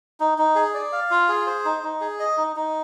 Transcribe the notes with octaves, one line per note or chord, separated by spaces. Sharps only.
D#4
D#4
G#4
D5
F5
F4
G#4
C5
D#4
D#4
G#4
D#5
D#4
D#4